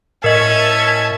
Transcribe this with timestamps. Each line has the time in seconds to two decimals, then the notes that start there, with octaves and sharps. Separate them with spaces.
0.24 A2 C#4 A#4 D#5 E5 A5 G#6